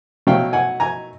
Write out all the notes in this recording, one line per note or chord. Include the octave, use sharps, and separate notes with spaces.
B2 F#3 A3 F5 G5
F#5 G#5
G#5 A#5